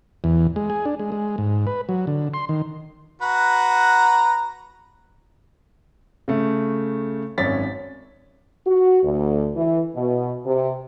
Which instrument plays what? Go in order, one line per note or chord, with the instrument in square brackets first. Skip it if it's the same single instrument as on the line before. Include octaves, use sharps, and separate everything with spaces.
[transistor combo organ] E2
G#3
G#4
D4
G#3
G#3
G#2
B4
F#3
D3
C6
D#3
[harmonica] F#4 B4 A#5
[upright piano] C#3 A3
G#1 F#2 C#4 A6 B6
[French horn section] F#4
D2
E3
B2
C3